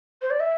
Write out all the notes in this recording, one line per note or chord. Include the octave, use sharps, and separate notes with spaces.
C5
D5
E5